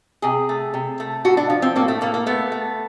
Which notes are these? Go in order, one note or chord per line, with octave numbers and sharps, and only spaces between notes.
C3 G#4
A3
C3
A3
A2 F#4
D4
F3
C4
A2 A#3
A3
A2 A#3
A#3
A3 B3
A3